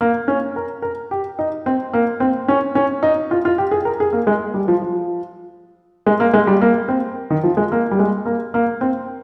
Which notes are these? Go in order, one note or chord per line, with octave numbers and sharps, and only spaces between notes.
A#3
C#4
A#4
A#4
G4
D#4
C4
A#3
C4
C#4
C#4
D#4
F4
F4
G4
G#4
A#4
G#4
A#3
G#3
G3
F3
F3
G#3
A#3
G#3
G3
A#3
C4
D#3
F3
G#3
A#3
G3
G#3
A#3
A#3
C4